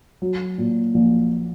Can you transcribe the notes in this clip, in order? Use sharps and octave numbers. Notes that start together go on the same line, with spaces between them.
F#3
A#2
A#1